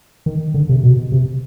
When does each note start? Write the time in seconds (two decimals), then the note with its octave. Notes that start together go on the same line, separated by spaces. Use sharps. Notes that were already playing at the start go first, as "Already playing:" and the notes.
0.26 D#3
0.54 D3
0.69 C3
0.83 B2
1.12 C3